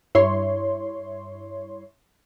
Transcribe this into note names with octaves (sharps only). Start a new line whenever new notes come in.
G2 E4 C#5 C6